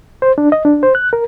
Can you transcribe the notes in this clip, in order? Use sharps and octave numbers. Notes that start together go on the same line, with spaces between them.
C5
D4
D#5
D4
C5
F#6
A#4